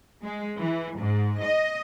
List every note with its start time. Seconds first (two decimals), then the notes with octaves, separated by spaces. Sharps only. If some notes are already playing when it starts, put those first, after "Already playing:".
0.23 G#3
0.58 E3
0.98 G#2
1.43 D#5